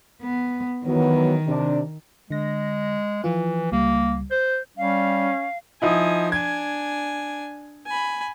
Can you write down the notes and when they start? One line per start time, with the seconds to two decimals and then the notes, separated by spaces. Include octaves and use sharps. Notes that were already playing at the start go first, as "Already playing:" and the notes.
0.22 B3
0.86 D#3 E3 F#3 B3
1.47 C3 D4
2.30 D3 G#3 A#6
3.24 E3 F3 E4 F4
3.72 C#2 G3 A#3
4.31 C5 G6
4.78 G3 C#4 F5
5.82 F3 D#4 E4 G#5 D#6
6.32 D4 G#5 G#6
7.87 G#5 B5